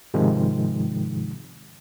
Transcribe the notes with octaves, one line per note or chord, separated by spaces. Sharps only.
G#2 C3 D#3 F3 G#3